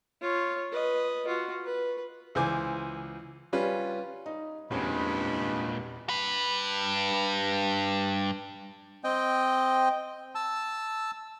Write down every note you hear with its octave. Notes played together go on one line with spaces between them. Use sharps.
F4 C#5
B4 D#5
F4 F#4
B4
C#2 E3 C5 G#5 D6
G3 C#4 F4 B4
D#4
E2 G2 A#2 G#3 C4 C#4 B5
G2 B4
C4 D#5 G5
A5 E6